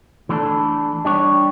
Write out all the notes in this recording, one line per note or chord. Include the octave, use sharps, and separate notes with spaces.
E3 A3 D4 A4
G3 D4 G4 C#5